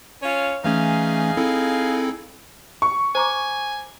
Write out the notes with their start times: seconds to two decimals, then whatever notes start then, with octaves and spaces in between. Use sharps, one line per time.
0.23 C#4 F4 C#5
0.64 E3 A3 C#4 D#4 G#4 F5
1.37 C4 E4 A4
2.82 C#6
3.15 C5 G#5 A#5 D6